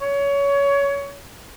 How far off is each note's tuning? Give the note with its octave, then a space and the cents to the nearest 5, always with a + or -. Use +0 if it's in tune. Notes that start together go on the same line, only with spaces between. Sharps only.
C#5 +20